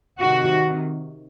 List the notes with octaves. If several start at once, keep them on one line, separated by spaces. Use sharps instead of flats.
C3 D#3 F#4